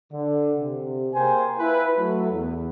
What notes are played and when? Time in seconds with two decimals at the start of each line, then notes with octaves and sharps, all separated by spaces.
0.13 D3
0.59 C3
1.14 A#3 G#4 C5 G5 G#5
1.59 E4 F4 B4
1.98 F#3 A3 E4 A4
2.32 E2